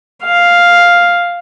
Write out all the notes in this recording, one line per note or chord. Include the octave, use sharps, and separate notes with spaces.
F5